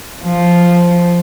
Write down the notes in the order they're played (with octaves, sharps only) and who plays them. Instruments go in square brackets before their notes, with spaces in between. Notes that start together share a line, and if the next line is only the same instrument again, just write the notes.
[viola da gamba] F3